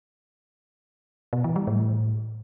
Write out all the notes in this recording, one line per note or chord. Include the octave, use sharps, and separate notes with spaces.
B2
E3
G3
A2